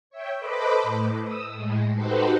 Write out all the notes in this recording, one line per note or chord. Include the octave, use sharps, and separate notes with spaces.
C#5 E5 G5
A4 B4 C5 D#5 B5 D6
A2
D#6 E6
A2 G#3
D#4 F#4 G4 A4 B4 C5